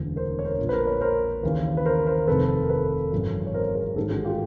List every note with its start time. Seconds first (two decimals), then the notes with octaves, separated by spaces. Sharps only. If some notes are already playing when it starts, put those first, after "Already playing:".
Already playing: E1 D2 C#3 E3
0.16 A#4 C5
0.39 C#5
0.45 A#4 C5
0.58 A#1 A#2
0.69 B4
0.73 A#4 C5
0.87 B4 C#5
1.01 A#4 C5
1.43 D#2 C#3 E3
1.77 B4
1.86 A#4 C5
2.06 A#4 C5
2.27 F1 F2 C3 D#3 A4 B4
2.63 A#4
2.69 A4 B4
3.12 G#1 F#2 C#3 E3
3.47 C#5
3.54 A#4 C5
3.75 G#4 A#4
3.96 A1 G#2 D#3 G4 A4
4.10 F#4 G#4
4.25 F4 G4